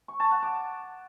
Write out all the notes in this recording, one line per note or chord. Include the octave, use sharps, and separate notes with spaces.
C#6
A5
F#5
D6